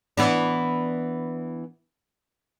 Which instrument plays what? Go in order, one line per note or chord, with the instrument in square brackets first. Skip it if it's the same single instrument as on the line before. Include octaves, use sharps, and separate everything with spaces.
[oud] E3 B3 D4